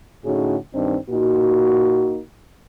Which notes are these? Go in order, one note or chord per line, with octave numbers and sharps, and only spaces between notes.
A2 D3 C#4 D#4 F#4 G#4
G2 D#3 C4 D4 D#4
A#2 A#3 D#4 F#4